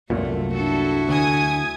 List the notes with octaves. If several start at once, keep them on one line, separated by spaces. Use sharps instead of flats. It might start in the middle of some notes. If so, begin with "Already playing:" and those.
C2 F#2 A#2 A3
D4 E4 F#4 A4
D2 G#5 D#6 G#6